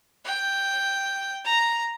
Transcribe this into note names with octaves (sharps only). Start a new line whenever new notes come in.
G5
A#5